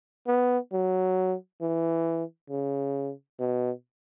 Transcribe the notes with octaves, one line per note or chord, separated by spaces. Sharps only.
B3
F#3
E3
C#3
B2